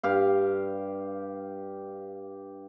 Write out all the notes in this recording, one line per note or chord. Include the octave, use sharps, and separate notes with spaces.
G2 G4 F5